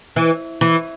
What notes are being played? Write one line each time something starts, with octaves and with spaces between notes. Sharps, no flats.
E3
E3